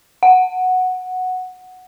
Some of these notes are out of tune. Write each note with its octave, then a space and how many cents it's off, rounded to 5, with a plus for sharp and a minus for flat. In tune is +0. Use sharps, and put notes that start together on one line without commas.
F#5 -5